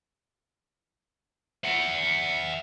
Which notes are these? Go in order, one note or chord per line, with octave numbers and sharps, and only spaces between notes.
E5 F#5